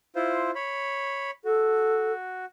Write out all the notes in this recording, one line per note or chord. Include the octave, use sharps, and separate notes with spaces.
E4 F4 C5
C#5 B5
F#4 A4